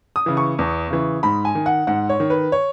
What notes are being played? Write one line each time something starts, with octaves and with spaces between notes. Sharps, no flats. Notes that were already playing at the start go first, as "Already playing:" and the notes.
D#6
C#3 E3
C#6
E2
C#3 E3
G#2 B5
G#5
D#3
F#5
G#2 F#5
C#5
D#3
B4
C#5